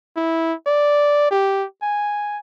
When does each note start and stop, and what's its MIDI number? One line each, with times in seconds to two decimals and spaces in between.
0.16 0.53 64
0.66 1.29 74
1.31 1.65 67
1.82 2.38 80